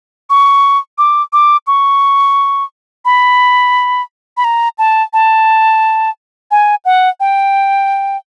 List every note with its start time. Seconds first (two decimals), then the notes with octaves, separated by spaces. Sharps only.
0.30 C#6
0.98 D6
1.33 D6
1.67 C#6
3.05 B5
4.37 B5
4.44 A#5
4.78 A5
5.13 A5
6.51 G#5
6.85 F#5
7.20 G5